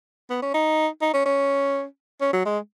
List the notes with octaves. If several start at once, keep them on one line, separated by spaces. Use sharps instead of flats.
B3
C#4
D#4
D#4
C#4
C#4
C#4
F#3
G#3